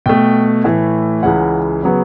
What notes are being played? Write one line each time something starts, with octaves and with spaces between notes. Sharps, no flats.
B2 A3 G5
A2 E3 A3
C#2 C#3 E3 F#5
C#3 F#3 B3